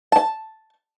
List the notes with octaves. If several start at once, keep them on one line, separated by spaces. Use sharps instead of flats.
A5